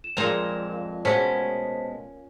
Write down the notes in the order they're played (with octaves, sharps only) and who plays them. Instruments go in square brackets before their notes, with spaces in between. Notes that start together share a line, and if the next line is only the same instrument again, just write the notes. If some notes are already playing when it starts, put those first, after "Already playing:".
[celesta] E7
[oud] F2 G#3 C5 [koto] A#2 A#5
[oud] B2 G#3 [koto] C#4 [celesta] C5 A5 B6